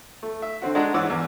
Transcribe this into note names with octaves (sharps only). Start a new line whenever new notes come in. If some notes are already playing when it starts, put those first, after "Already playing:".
A3
E5
D3 C4 F#4
G#3 D4 F#4 A#5
G#2 E3 B4 C#5 D6 E6
E2